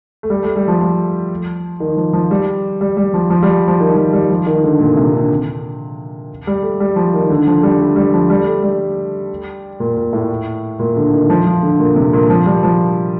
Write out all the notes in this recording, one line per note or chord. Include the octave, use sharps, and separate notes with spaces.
A3
G3
A3
G3
F3
F3
D#3
F3
F3
G3
G3
G3
F3
F3
G3
F3
D#3
F3
G3
F3
D#3
D3
A#2
C3
D3
G3
A3
G3
F3
D#3
D3
F3
G3
A3
G3
F3
G3
A3
G3
A#2
A#2
A2
A#2
D3
D#3
F3
F3
D3
A#2
C3
A#2
F3
G3
F3